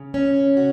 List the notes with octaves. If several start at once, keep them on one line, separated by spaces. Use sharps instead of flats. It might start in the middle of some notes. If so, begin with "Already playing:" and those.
Already playing: C#3
C#4
F#4